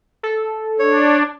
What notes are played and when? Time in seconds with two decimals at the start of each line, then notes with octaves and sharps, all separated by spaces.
0.23 A4
0.79 D4 C#5